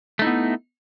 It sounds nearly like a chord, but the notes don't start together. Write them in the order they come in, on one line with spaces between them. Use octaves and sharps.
A3 D#4 E4 B3